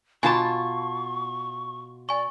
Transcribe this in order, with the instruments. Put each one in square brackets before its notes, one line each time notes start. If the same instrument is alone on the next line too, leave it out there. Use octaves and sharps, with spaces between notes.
[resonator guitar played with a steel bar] B2 F4 A5 [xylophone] G#5 B5 [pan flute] C#6
[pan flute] D5 [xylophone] G#5 C#6